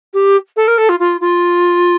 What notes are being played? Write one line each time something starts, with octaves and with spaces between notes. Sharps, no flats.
G4
A4
A#4
A4
F4
F4
F4